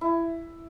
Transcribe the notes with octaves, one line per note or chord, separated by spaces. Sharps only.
E4